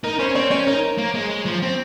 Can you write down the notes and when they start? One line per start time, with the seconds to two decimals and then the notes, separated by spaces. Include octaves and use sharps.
0.04 D#4 A#4
0.19 C#4 C5
0.35 C4 C#5
0.51 C#4 C#5
0.67 D#4 A#4
0.98 A#3
1.15 G#3
1.30 G#3
1.46 F3
1.62 C4